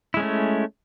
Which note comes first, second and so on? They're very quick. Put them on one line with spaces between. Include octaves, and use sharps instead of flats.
E4 G#3 C#4 A3